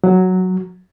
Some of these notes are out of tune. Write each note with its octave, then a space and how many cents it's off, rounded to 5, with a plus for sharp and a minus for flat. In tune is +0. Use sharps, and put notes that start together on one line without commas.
F#3 +0